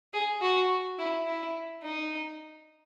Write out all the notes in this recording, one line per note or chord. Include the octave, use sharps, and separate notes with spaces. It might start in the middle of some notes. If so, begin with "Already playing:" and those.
G#4
F#4
E4
E4
D#4